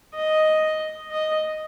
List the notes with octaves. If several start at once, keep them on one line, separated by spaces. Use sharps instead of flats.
D#5
D#5